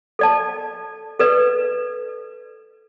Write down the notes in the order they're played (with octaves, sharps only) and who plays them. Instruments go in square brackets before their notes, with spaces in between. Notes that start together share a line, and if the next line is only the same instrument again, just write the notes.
[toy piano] A4 D5 A5
A4 B4 D5